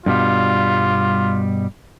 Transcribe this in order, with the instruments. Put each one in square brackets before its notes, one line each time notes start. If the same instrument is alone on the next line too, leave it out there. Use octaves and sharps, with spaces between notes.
[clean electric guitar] G2 B2 G3 [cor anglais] F4